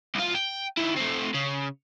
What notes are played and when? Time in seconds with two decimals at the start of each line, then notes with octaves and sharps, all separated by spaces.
0.15 C2 F4
0.34 G5
0.77 D#3 E4
0.96 A3 C4
1.35 C#3